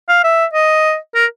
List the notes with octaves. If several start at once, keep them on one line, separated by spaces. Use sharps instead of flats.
F5
E5
D#5
A#4